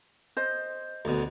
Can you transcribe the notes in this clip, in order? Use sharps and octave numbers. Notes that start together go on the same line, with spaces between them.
C5 D#5
D2 B2